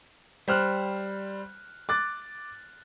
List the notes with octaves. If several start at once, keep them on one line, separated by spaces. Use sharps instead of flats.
G3 C5 F6 F#6
D6 F#6 A6